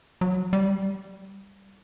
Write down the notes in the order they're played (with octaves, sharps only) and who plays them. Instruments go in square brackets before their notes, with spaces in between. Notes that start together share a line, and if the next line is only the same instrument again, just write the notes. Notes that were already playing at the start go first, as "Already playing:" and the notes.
[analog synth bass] F#3
G3